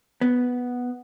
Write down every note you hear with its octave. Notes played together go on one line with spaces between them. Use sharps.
B3